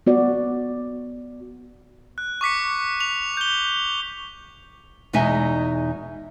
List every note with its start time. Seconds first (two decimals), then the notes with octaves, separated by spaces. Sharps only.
0.07 B3 F#4 D5
2.18 F#6
2.41 C#6 D6 B6 C#7
3.01 F7
3.37 G6 G7
5.13 E2 B2 G#3 D#4 E5 G#5